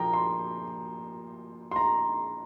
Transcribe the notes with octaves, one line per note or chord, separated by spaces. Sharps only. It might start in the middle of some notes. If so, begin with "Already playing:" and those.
Already playing: A#2 F3 A#3 G5 A#5
C6
C6
A#5